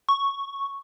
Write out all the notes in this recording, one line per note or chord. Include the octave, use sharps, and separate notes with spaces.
C#6